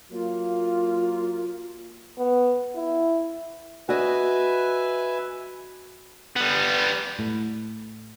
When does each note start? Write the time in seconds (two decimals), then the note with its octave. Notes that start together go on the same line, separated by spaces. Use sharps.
0.11 F#3 A#3 F4
2.18 B3
2.75 E4
3.89 F#4 B4 D#5 E5 G#5
6.36 G3 B3
7.19 A2